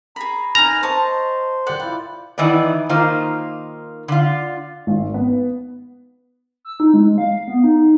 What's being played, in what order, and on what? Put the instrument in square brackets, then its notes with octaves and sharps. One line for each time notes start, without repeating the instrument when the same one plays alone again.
[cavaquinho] G#4 B5 [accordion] A#5
[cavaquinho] D#4 B4 [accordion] G#5 F6 [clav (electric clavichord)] A#5
[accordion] C5 C6 [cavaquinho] D#5 A5 C#6
[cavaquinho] D5 F#5 G5
[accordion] E4 F4 [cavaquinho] D5
[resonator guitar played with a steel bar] D#3 E3 B3 D#4 D5
D#3 A#3 D#4 F4 C5
D3 F4
[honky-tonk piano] G#1
B3
[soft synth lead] E6
D#4
G#3
F5
B3
D#4